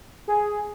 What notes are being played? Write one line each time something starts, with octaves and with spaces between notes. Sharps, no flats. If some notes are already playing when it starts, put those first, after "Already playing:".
G#4